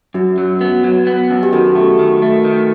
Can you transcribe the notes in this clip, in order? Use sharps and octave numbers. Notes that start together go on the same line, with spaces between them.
F#2 F#4
F#3
B3
F#3
B3
F#2
G4
D#3 F#4 A4
A3
D#3
A3
D#3